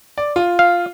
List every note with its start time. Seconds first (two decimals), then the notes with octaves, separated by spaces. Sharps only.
0.18 D5
0.36 F4
0.59 F5